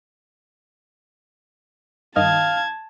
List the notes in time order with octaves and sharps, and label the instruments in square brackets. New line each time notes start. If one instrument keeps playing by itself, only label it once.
[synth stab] G2 D#3 D#5 [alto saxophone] F5 [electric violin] A5 G#6